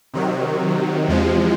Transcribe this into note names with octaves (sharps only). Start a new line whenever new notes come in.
C3 D#3 F#3
E2 C3 F3 G#3